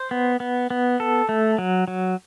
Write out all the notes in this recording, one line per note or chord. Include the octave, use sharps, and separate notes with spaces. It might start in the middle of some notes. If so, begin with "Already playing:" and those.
Already playing: C5
B3
B3
B3
A4
A3
F#3
F#3